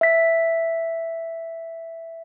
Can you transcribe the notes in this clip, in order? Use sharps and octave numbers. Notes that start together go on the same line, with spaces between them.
E5 B6